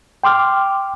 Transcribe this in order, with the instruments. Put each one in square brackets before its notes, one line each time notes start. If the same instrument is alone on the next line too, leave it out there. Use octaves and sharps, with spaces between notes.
[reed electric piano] G5 C6 D6 F6